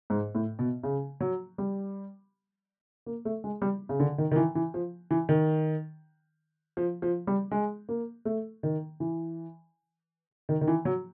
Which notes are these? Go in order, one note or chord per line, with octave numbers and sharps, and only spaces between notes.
G#2
A2
B2
C#3
F#3
G3
A#3
A3
G#3
G3
C#3
D3
D#3
D#3
E3
E3
F3
E3
D#3
F3
F3
G3
G#3
A#3
A3
D#3
E3
D#3
D#3
E3
F#3